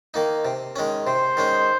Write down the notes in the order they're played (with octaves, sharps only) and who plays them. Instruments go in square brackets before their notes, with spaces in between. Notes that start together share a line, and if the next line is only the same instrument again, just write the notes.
[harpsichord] D#3 A#3 D#4
C3
D#3 G#3 C#4
[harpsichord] C3 [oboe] C5
[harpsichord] D#3 G#3 C#4